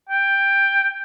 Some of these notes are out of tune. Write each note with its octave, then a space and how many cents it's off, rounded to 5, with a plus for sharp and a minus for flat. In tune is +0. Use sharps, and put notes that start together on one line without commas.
G5 +10